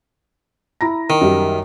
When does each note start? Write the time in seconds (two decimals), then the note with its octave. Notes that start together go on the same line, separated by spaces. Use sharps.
0.81 E4 A#5 A#6
1.10 D#3
1.21 F#2 G3